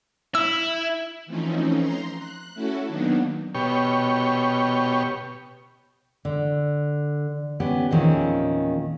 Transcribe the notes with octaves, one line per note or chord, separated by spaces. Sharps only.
E4 E6
E3 F3 A3 C4 C#4 D#4
A#5 C6
F#6
A3 C#4 E4 F#4 A4
D#3 F#3 A#3 B3 D4 D#4
B2 G4 C#5
D3
B3 C#4 G4
E2 A#2 D#3 F3 C4 C#4